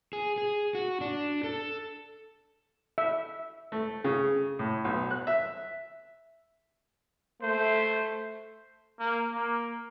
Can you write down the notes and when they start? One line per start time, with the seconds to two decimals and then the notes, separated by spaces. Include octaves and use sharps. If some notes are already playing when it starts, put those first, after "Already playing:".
0.13 G#4
0.38 G#4
0.75 F#4
1.01 D4
1.44 A4
2.98 E5
3.72 A3
4.04 C#3
4.59 A2
4.84 B1
5.11 F#6
5.27 E5
7.42 A3 C5
9.00 A#3
9.33 A#3